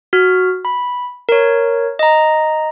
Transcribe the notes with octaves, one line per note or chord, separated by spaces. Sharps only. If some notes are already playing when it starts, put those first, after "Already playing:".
F#4 F6
B5
A#4 C#5
D#5 A#5